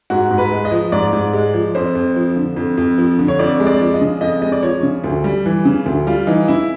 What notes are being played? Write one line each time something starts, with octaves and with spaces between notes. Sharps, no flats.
G#2 F#4
G#2
B4
G#3
D#5
F3
G#2 D5
G#2
G#3
F3
F2 C5
F2
F3
D3
F2
F2
F3
D3
C#5
F2 D5
G#3
D5
F3
D#5
C#3
F2 D#5
G#3 D#5
D5
F3 C#5
C#3
D2
G3
E3
C#3
D2
G3 F4
E3 D#4
C#3 E4